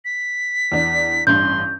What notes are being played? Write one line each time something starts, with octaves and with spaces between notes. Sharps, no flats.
B6
E2 D4
A1 G2 C6 G6